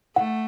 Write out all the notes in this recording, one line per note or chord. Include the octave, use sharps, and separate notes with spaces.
A3 F#5